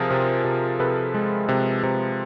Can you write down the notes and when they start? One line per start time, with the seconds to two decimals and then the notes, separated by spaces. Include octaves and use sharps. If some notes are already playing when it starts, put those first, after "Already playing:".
Already playing: C3 F3 G#4 A#4
0.10 C3
0.44 C3
0.79 C3 A4 B4
1.14 G#3
1.49 C3
1.83 C3